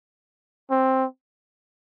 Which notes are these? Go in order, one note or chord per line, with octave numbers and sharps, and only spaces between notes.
C4